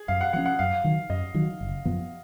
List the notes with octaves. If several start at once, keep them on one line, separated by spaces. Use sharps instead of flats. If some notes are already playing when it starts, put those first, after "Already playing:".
Already playing: G#4
F#2 F5
F#5
F3 A#3 C#4 F#5
F#5
F#2 F5
D#3 F#3
F#2 D#5
D#3 F#3
F#1
F#2 F3 B3